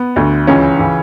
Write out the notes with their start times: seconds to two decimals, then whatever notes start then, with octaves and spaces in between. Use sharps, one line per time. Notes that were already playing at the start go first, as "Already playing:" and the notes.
Already playing: B3
0.16 D2 D3
0.47 C#2 C#3 E3 C#4
0.79 C#3 E3